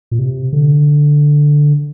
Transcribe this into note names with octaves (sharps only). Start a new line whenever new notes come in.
A#2
C3
D3